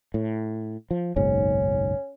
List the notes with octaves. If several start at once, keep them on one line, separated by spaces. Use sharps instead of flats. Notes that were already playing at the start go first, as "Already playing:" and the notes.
A2
F3
F#1 B1 G#2 C#4